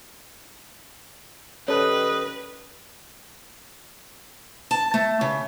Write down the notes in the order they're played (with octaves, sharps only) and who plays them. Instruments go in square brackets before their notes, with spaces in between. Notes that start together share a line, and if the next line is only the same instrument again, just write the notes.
[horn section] D#3 G3 D#5 [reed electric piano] C#4 A4 F#6 [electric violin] B4 [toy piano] C#5
[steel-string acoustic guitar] A5
A3
C#3